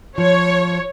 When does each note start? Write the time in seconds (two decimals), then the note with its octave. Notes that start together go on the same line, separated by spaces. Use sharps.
0.18 F3 C#5